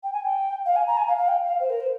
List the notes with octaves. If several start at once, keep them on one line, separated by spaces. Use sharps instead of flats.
G5
G#5
G5
F5
G#5
A#5
G#5
F5
F5
G5
F5
C5
A#4
C5